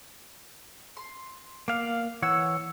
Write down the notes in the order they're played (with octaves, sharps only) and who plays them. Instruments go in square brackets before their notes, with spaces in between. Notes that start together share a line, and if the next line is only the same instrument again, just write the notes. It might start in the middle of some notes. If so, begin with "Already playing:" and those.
[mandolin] C6
[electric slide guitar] A#3 F5 [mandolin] B3 D5
[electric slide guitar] E3 C#5 F#5 [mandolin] E6